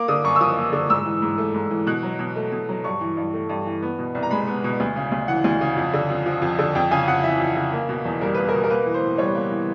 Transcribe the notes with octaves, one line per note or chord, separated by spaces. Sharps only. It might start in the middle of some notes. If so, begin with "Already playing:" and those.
Already playing: A#3 D6
D3 D#6
F#2 C#6
E6
F3 D#6
A#3
D3
G#2 E6
E3
G#2
A3
G#2
E3
B2 F#6
F#3
B2
A3
B2
F#3
G2 C#6
E3
G2
A3
G2
E3
B3
B2
C2
A#5
G#3 B5
B3
B2
D2
C#3
D2
E3 F#5
D2
C#3
F2
D3
F2
F3
F2
D3
F2 G5
C#3 G#5
F2 F#5
E3 E5
F2
C#3
A#3
B2
E2
G3 A#4
A#3 B4
A#4
B2
A#4
A#3 B4
E3
C5
A2
G3 C#5
A#3
E3